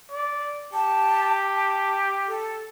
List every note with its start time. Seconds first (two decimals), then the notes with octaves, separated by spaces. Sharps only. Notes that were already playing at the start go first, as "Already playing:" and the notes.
0.12 D5
0.74 G4 A5
1.52 A5
2.28 A4